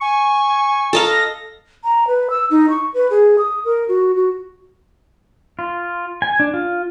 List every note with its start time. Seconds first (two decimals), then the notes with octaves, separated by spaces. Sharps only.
0.01 G#5 C#6
0.93 A4 D#5 F5 A#5
1.07 A#6
1.84 A#5
2.07 B4
2.30 E6
2.51 D#4
2.70 C#6
2.94 B4
3.10 G#4
3.38 D#6
3.65 A#4
3.88 F#4
4.15 F#4
5.59 F4
6.22 G#5
6.40 D4
6.54 F4